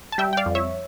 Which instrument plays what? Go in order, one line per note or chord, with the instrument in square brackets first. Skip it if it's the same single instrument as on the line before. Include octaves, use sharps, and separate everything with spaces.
[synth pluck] A5
G3 E5 G5
G5
D5 F5
F2
C#5 E5